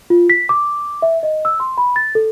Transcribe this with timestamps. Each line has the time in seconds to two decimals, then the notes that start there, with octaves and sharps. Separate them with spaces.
0.10 F4
0.30 B6
0.49 D6
1.02 E5
1.23 D#5
1.45 E6
1.60 C6
1.78 B5
1.96 A6
2.15 A4